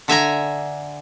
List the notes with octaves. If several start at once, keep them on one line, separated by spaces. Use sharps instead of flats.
D3 E5 G#5 A#5